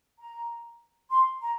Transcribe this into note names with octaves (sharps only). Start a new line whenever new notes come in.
A#5
C6
A#5